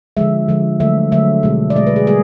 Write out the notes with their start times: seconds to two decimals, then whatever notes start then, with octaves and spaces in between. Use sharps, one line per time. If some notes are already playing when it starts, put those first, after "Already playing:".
0.17 D3 F3 G#3 E5
0.48 D3 F3 G#3
0.80 D3 F#3 A3 E5
1.12 D3 F#3 A3 E5
1.43 B2 G#3
1.70 D5
1.75 B2 G#3 D#5
1.87 B4
1.96 G#4
2.07 G3 A#3 G#4